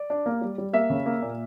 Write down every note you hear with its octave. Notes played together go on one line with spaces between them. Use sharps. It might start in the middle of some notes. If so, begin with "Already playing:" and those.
Already playing: D5
D4
A#3
G3
G3
A#3 E5
C#3
A#3
A#2